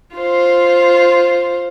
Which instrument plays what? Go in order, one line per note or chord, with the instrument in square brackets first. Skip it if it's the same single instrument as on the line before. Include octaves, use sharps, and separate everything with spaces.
[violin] F4 C5